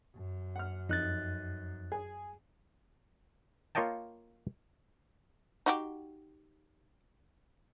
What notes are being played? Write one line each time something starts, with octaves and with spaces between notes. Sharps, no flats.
F#2
F#5 F6
F2 D#4 F#6 A6
G#4 G#5
A#3 F4 C#5 D#5 G5 A5
D#4 F#4 G4